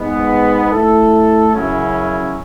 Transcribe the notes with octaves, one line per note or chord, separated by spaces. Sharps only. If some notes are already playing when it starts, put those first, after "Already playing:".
Already playing: G#2 G#3 B3
A3 E4 A4
F#2 C#3 F#3 C#4 E4